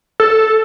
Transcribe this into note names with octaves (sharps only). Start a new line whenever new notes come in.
A4